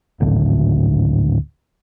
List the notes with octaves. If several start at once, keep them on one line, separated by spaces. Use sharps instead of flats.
G#1 D2 A2 D3